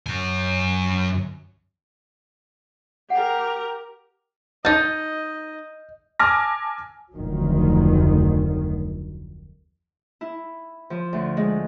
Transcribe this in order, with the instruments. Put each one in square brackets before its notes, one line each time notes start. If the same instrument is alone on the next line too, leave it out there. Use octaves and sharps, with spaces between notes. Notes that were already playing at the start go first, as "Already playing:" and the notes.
[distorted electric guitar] F#2 G#5
[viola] G4 A#4 [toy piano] F#5
[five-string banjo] D#4 A5 [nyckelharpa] D#5 [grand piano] G6
[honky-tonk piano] G#5 A5 D6 E6 F6 A#6
[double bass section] F1 D2 D#3 F#3
[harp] E4
F3
D2
G#3